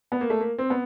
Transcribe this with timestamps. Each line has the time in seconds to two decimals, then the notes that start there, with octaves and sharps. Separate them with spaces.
0.12 B3
0.21 A#3
0.30 A3
0.40 A#3
0.58 C4
0.70 B3